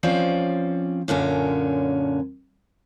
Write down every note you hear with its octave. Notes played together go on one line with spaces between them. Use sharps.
F3 C4 C#4 D5
F#2 A#2 D3 C#4